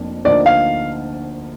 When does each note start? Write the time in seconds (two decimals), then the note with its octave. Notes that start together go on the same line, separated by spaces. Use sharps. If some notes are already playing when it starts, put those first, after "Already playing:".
Already playing: F1 F2 A#3 D4
0.25 D2 D3 F3 A#3 D#4 D5
0.46 F5